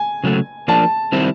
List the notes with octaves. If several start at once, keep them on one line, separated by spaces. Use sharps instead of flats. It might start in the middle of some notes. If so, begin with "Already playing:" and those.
Already playing: G#5
C#3 F#3 A3
F3 A#3 D4 A5
D#3 G3 C4 E4